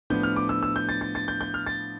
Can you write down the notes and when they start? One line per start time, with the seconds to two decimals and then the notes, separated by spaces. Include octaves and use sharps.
0.10 A2 F3 B3 D4 G6
0.23 F6
0.36 D6
0.49 E6
0.63 E6
0.76 G6
0.89 A6
1.01 A6
1.15 A6
1.28 G6
1.41 G6
1.54 F6
1.66 A6